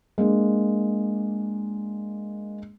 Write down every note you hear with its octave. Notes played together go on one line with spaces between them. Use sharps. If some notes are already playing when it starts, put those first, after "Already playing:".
G#3 A#3 D4